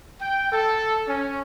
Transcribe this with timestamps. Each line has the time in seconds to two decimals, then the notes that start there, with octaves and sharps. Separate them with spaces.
0.21 G5
0.52 A4
1.08 C#4